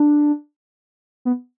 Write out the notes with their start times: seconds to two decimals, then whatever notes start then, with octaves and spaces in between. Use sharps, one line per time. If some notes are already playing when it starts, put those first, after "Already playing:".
Already playing: D4
1.25 B3